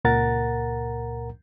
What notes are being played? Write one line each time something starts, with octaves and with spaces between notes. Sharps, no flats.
C#2 A#2 A#4 F#5 A#5 A6